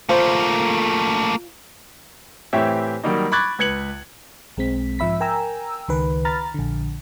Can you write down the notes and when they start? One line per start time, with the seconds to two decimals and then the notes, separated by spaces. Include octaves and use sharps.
0.09 A3 A#3 F4 C5 F5
2.53 A2 E3 C4 G4 C#5 E5
3.04 D#3 F#3 G3 A#3 D#4
3.32 B5 C#6 D6 F#6 G#6 A6
3.58 C#2 B4 G#6 C#7 F#7
4.57 B1 G#3 C4 B6
4.99 G#2 F3 E5 B5 B6
5.20 A#4 G5 G#5 A#5 E6
5.88 C#2 D#3 B4
6.25 A#5 B5 F6 A6
6.54 A#1 D3